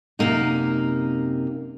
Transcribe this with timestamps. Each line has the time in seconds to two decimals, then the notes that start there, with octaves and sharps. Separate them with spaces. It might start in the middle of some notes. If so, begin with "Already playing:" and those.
0.19 F#2 C3 A#3 D#4